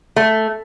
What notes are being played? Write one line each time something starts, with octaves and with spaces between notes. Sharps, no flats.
A3